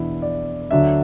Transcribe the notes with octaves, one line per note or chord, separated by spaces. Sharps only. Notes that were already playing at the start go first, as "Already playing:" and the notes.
Already playing: E2 B2 B3 D4 E4
D5
D2 D3 F#3 D4 E5